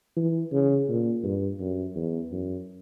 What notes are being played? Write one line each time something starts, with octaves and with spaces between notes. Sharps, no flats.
E3
C#3
A#2
G2
F#2
E2
F#2